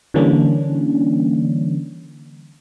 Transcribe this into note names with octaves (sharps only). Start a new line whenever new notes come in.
D3 E3 G3 A#3 C#4 D4